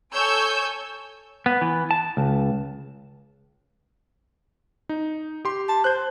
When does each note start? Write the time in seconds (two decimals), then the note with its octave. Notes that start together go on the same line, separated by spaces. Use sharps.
0.13 A4 C#5 G#5 E6 G6
1.46 B3
1.61 E3
1.91 A5
2.17 C#2
4.89 D#4
5.45 G4 C6
5.69 A5
5.84 C5 F#6 G6